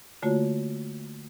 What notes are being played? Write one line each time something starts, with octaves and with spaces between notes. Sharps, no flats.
D3 A3 A#3 F4 F#4 C#5